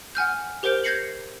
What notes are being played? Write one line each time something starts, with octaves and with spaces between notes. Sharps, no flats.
F#5 G#5 F6 G6
G4 A#4 C5 G6 D7 G7
G6 G#6 A#6 C7 C#7 F#7